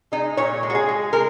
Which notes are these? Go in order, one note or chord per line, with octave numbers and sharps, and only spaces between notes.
G#3 D#4
A#2 C#5
G#3
F#4
G#4
G#3
G#3 A#4